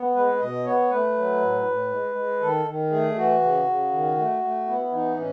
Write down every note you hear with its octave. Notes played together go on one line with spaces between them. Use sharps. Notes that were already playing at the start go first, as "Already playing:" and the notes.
Already playing: B3
G#3 B4
B2 D#5
B3 C#5
A3 B4
F#3
A2
A2
G#3
G#3
D#3 A4
D#3
A3 G#4
E3 F#4
C#3
C#3
D#3
A3
A3
B3 E4
E3 D#4
A2 C#4